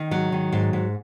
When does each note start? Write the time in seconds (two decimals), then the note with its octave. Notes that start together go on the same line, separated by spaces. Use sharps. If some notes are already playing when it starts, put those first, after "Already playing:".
Already playing: D#3
0.11 G#2 F#3
0.32 D#3
0.52 G#2
0.73 G#2